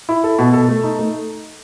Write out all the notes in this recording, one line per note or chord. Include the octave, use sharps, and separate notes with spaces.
E4
A4
B2
A4
A3
D#4
A3